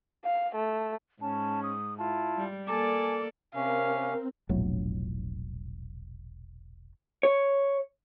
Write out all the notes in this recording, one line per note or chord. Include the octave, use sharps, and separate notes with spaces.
F5
A3
G#2 C#4 A5
D#6
E4 F4 A5
G3
A#3 A4 D5 G#5 A5 D6
C3 C4 C#4 A#4 F5
E1 A#1 A2 F#3
C#5